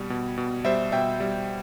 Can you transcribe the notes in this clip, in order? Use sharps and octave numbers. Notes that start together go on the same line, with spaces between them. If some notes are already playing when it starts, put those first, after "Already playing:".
Already playing: B2 G3
B2
B2
G3 C5 E5
B2 E5 G5
G3